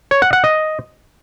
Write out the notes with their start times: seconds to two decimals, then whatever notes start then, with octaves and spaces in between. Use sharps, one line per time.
0.11 C#5
0.22 F#5
0.33 F#5
0.44 D#5